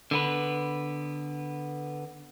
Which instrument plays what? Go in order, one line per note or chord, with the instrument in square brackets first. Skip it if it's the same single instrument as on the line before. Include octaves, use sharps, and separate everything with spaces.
[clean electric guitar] D3 B3 B4